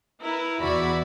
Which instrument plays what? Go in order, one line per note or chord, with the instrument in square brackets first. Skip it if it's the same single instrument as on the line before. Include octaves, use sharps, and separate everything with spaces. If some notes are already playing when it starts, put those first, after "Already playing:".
[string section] E4 A#4 B4
E2 E4 F#4 D5 E5 B5